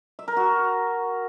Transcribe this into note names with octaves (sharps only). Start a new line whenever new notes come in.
E5
A#4
F#4